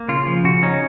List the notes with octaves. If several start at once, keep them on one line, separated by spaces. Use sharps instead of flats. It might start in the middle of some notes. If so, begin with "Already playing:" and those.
Already playing: A#3
C#3 F4
F3
C#3 F#4
C#4 D#4